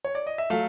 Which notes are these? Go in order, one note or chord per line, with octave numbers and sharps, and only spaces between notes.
C#5
D5
D#5
E5
F#3 A3 F5